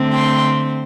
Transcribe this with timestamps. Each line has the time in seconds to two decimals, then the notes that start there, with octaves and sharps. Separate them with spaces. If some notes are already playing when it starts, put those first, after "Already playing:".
Already playing: D3 A3 C4
0.14 G5 C6